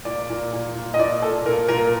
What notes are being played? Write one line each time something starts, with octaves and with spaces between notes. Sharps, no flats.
A#2 D5
A#2
A#2
A#2
D#5
A#2 D5
A#2 A4
A#2 A#4
A#2 A#4